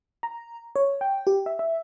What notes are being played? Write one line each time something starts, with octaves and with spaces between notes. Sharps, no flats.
A#5
C#5
G5
G4
E5
E5